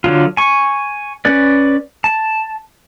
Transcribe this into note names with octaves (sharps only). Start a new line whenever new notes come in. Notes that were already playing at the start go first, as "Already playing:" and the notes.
D3 F#3 F4
G#5 C#6
C#4 B4 D5
A5